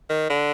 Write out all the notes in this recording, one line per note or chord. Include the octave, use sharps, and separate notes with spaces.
D#3
D3